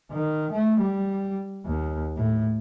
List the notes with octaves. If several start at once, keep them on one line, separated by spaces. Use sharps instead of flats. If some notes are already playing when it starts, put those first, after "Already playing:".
D#3
A3
G3
D#2
A2